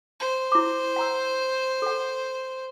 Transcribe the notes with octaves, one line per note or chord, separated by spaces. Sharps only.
C5
E4 D6
F#5 A#5 E6
A4 F#5